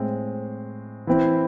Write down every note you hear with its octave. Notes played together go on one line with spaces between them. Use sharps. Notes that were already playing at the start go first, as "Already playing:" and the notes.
Already playing: A2 G#3 C4
E3 C4 E4